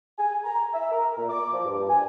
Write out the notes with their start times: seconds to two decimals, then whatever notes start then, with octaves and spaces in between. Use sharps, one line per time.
0.19 G#5
0.44 A#5
0.74 E5
0.92 A#4
1.18 A#2
1.30 D6
1.53 F3
1.66 G2
1.89 G#5